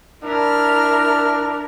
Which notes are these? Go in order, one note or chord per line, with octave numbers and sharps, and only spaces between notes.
D4 E4 A#4 F6